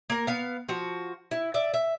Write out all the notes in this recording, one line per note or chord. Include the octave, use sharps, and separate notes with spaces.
A#3 A#4
B3 F5
F3 F#4
E4
D5 E5
E5